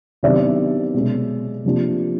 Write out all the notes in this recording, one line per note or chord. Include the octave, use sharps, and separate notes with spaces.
C3 D#3 F#3 B3 D4 D5 E5
B2 G#3 C#4
C3 F3 A#3 D4